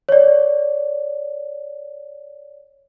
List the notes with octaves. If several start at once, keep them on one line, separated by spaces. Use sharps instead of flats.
C#5 D5